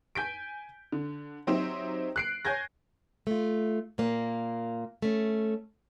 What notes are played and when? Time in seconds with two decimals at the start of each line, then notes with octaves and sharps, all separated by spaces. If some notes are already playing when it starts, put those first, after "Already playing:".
0.15 G#5 G6 B6 D7
0.92 D3
1.47 F#3 C4 D#4 G4 C5 E5
2.16 F#6 C7 D7
2.45 C#5 G#5 G6 G#6 A#6
3.27 A3 F4
3.98 A#2 A#3
5.02 A3 C#4